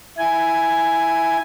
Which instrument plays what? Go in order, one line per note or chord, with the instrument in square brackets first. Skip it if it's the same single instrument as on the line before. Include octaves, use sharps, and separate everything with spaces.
[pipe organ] E4 G#5